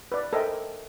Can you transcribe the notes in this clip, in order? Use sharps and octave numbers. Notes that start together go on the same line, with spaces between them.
B4 D5
A4 A#4 C5 D#5 E5 G5